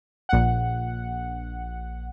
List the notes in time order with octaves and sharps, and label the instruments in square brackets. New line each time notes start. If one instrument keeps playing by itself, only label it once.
[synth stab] A#1 F#5